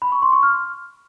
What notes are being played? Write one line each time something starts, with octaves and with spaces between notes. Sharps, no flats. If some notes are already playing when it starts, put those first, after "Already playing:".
B5
C#6
C6
C#6
F6